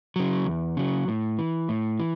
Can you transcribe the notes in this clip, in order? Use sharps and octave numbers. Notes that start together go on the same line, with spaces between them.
C#3 F#3
E2
C#3 F#3
A2
E3
A2
E3